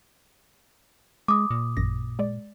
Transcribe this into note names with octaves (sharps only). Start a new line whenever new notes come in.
G#3 D6 D#6
A#2
A1 F#2 A#6
G#3 D5